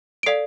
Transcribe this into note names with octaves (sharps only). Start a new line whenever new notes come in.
D7
A4 D5 F5 C7